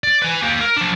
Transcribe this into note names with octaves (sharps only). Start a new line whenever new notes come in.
D5
B4 G#5
A#3 G4
A#4
F3 D4